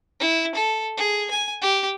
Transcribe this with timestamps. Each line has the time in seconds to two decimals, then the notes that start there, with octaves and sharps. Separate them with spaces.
0.20 E4
0.55 A4
0.98 G#4
1.31 G#5
1.62 G4